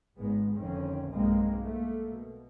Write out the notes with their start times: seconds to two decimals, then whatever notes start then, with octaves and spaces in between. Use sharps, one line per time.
0.18 G#1 G#2 G#3 B3
0.57 F1 F2 D3 D#3 C4 C#4
1.11 B1 G2 B2 G#3 A#3 C4
1.63 A3 A#3
2.11 B2